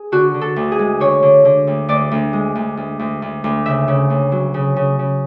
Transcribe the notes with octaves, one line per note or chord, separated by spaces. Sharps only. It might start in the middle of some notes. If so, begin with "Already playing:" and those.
Already playing: G#4
D3 F#4
D3
A4
D2
G#4
G#3
D3 C#5
D3
D3
D2
D2 D5
D2
G#3
D2
D2
D2
D2
D2
C#3 E5
C#3
D2
F#3
C#3
C#3
C#3